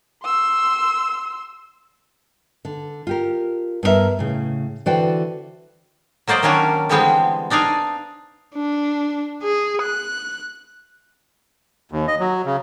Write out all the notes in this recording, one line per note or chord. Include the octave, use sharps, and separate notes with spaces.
C6 E6
D3
F4 G4 A#4
G2 B3 D#4 A#4 E5
A2 C#3
D3 E3 F#4 C5 D5 G5
F#3 A#3 C5 D5 D#5
D#3 F#3 A#3 C#4 D4 A#4
D3 E3 G3 G#3 B3 C4
D4 D#4 D5 F5 G#5
D4
G#4
F#6
D#2
D#5
F#3
C#3